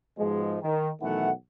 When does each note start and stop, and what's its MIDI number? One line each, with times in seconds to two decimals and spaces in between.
0.18 0.56 44
0.18 0.56 47
0.18 0.56 53
0.18 0.56 56
0.62 0.89 51
1.01 1.30 35
1.01 1.30 51
1.01 1.30 52
1.01 1.30 57
1.01 1.30 78